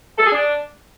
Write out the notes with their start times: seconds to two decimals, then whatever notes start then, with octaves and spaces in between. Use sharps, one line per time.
0.18 A4
0.25 G#4
0.32 D4